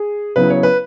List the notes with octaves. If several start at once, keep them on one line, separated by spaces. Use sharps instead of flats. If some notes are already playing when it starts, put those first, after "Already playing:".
Already playing: G#4
C#3 F#3 B3 E4 B4
C#5
B4